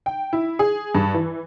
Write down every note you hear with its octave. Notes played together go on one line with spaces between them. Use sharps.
G5
E4
G#4
G2
E3